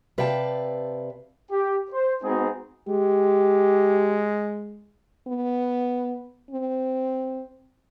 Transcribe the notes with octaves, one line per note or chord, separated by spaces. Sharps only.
C3 B4 D5 F5 G5 A5
G4
C5
G#3 B3 C4 D#4 F#4 G#4
G#3 G4
B3
C4